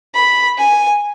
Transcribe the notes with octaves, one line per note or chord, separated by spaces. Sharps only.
B5
G#5